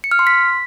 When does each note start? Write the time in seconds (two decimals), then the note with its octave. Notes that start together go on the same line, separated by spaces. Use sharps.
0.04 C#7
0.11 F6
0.19 C6
0.27 B6